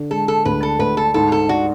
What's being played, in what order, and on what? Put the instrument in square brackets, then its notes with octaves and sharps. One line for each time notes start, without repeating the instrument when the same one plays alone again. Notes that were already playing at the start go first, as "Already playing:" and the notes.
Already playing: [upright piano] D3
[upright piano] G#3 [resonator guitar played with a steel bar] A4
[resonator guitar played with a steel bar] A4
[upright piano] D2 [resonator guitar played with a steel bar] B4
[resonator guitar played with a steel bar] A4
[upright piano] D2 [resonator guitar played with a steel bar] B4
[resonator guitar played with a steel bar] A4
[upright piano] G#2 [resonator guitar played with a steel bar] A4
[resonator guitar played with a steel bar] A4
[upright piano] D4 [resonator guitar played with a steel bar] F#4